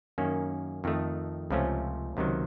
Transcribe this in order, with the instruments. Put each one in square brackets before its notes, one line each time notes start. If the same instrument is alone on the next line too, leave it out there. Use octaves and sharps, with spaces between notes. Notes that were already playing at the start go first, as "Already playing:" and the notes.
[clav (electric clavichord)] F#2 D#3 A#3 C#4
F2 D#3 A3
C#2 C3 F3 A3 C#4
C#2 C3 D#3 F#3